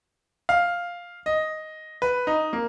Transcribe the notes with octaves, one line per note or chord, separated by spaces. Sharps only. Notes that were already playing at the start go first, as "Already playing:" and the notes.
F5
D#5
B4
D#4
A#3